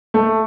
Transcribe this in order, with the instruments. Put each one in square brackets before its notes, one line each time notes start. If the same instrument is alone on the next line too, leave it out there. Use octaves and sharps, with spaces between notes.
[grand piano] A3